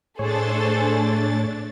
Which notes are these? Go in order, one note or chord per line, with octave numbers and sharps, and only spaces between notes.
A2 A3 D4 G#4 A4 C5 C#5 A6